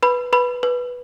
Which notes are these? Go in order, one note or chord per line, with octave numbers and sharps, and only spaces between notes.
B4 B5
B4 B5
B4